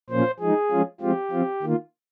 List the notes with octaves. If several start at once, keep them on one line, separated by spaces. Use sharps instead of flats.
A#2 F3 A#3 C#4 F4 C5
F3 G#3 D#4 G#4
F3 G#3 C#4 F4
F3 G#3 C4 F4 G4
F3 C4 F4
D#3 A#3 F4